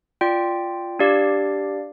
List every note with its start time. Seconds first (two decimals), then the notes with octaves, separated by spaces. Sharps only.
0.21 F4 D5 G5
0.99 D4 G4 D5 F5